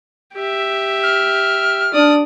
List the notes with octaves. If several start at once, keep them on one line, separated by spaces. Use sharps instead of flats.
G4 E5
F6
D4 D5 D#6